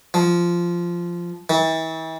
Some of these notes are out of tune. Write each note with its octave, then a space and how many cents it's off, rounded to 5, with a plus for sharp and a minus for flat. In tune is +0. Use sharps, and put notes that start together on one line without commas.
F3 -10
E3 -40